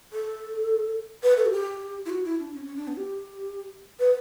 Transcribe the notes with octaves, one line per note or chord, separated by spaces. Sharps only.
A4
B4
A4
F#4
G4
E4
F#4
E4
D4
C#4
C#4
D4
B3
G4
B4